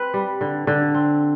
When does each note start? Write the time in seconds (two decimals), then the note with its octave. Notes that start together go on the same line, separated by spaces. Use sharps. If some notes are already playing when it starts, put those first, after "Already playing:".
Already playing: C4 B4
0.14 G3
0.41 D3
0.67 D3
0.94 C4